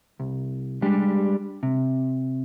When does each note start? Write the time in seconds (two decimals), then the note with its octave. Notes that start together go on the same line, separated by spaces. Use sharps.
0.20 C2
0.82 G3 G#3 D4 G4
1.63 C3